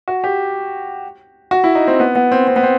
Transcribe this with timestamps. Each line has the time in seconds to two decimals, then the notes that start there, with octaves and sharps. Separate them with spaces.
0.08 F#4
0.24 G4
1.51 F#4
1.64 E4
1.75 D#4
1.88 C4
2.00 B3
2.15 B3
2.32 C4
2.48 C4
2.56 B3
2.63 C4